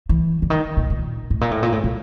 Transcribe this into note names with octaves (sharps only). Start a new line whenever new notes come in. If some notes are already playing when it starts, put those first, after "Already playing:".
E3
D3
D#3
A#2
A#2
A2
A#2
A2
A#2
A2
A#2